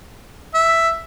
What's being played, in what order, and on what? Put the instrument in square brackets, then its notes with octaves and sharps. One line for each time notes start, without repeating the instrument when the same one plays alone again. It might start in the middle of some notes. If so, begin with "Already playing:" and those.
[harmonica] E5